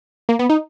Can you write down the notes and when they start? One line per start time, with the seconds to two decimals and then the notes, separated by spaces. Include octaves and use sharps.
0.29 A#3
0.39 B3
0.50 D#4